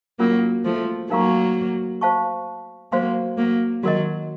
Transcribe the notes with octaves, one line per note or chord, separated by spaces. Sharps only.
F#3 A#3 C#4 F4 A#4
F3 A3
F#3 A#3 D#4 A#4 F5 A#5 C#6
C5 F5 A5 C#6
F#3 A#3 C5 F5 C6
F#3 A#3
D#3 F#3 F#4 A#4 D#5